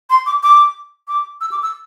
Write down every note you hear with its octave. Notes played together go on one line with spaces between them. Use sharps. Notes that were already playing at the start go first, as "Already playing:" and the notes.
C6
D6
D6
D6
E6
D6
E6